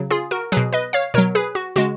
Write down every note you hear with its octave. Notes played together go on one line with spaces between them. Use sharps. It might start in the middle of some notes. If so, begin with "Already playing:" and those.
Already playing: C#3 F#3
F4 G#4
F#4 A#4
B2 F#3 G#4 B4
B4 D#5
C#5 F5
B2 F#3 A#4 C#5
G#4 B4
F#4
C#3 G#3 F#4